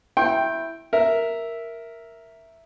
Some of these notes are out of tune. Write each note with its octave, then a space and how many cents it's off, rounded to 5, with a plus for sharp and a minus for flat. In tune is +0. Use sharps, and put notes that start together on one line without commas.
E4 +0 G5 +0 C6 +45
A#4 +0 E5 +0